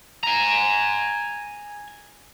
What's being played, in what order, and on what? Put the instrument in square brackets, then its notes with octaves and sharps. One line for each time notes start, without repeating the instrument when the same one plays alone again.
[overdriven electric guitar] G#5 A#5